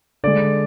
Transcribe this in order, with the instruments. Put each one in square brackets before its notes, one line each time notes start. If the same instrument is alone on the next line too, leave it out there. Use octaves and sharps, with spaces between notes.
[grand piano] D3 G#3 D5